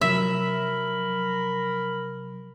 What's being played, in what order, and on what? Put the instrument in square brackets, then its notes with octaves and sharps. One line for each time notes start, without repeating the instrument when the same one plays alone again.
[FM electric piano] C3 F3 F#3 [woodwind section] A#4 B5 [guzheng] E5